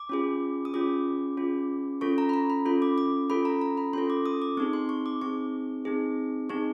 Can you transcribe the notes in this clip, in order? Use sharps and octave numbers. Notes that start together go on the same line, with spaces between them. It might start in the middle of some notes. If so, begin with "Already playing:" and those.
Already playing: D6
C#4 F4 G#4
D#6
C#4 F4 G#4 D6
C#4 F4 G#4
C#4 F4 A4 C#6
A#5
B5
A#5
B5
C#4 F4 A4 B5
D6
D6
C#4 F4 A4 B5
A#5
A#5
B5
C#4 F4 A4 C6
D6
D#6
D6
C4 D#4 G#4 C#6
C6
C#6
D6
C4 D#4 G#4 C#6
C4 D#4 G#4
C4 D#4 G#4 C#6